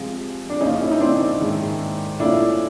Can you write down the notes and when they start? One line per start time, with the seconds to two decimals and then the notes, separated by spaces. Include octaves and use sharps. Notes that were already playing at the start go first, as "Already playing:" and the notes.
Already playing: C3 F3 G#3
0.50 D4
0.61 C#3 F3 A#3 C#4 D#4
0.83 E4
0.91 D#4
1.00 C4 D4
1.40 G#2 D#3 G#3
2.20 A#2 F3 A3 C#4 D4 E4 F4